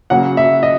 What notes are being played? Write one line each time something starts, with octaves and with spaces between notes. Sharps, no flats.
C#3 F#3 A#3 F#5
E5
D#5